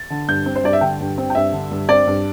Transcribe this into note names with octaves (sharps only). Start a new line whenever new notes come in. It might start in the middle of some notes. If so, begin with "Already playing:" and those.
Already playing: A6
D3
G2 G6
C4
C5
G2 D5
E5
D3 G5
G2
C4
G5
G2 E5
D3
G2
C4 D5
G2